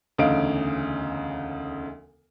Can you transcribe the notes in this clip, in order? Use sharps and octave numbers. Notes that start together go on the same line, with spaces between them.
E1 D2 C#3 D#4 F5 D7